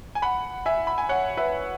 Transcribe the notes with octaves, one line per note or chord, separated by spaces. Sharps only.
G#5
F#5 B5
E5 G#5
B5
G#5
C#5 F#5
B4 E5